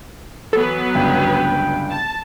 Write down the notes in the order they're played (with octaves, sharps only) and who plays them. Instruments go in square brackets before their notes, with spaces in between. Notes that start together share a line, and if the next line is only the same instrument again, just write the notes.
[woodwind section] E3 [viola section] F#3 B3 B4 [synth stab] A4
[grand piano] G1 C#2 G2 [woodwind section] G5
[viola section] A5